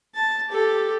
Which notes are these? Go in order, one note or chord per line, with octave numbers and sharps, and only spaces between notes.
A5
G4 A4